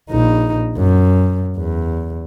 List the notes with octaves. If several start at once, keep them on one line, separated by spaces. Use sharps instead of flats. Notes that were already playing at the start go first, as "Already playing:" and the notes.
A#1 D#4
F#2
E2